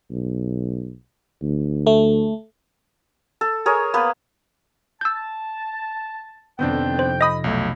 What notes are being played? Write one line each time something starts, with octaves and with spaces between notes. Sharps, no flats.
B1
D2
A3
A4
G#4 A#4 C#5
A#3 B3 B4
A5 E6 G6
F2 C3 D#3 B3 C4 D4 G5
C5
D#5 B5 D#6 A#6
B1 A3 E4